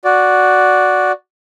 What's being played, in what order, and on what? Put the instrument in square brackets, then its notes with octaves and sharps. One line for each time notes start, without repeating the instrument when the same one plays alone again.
[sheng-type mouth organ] F#4 D5